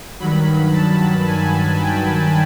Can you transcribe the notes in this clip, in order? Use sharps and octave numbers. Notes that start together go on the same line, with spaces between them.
G2 D#3 F#3 B5
A5
G#5
G5